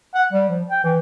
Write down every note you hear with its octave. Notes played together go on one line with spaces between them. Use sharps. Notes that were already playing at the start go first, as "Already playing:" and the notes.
F#5
G3
F3
G5
E3